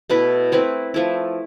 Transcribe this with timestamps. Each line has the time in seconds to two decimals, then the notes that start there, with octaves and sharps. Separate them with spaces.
0.10 B2 A3 E4 B4
0.52 A3 C4 E4 B4
0.94 F3 A3 E4